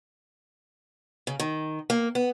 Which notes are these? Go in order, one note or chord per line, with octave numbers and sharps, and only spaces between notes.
C#3
D#3
A#3
B3